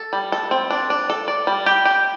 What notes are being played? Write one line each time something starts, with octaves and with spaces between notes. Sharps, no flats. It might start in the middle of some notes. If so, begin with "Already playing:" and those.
Already playing: A4
G3
A4
C4
D4
D4
A4
D5
G3
G4
G4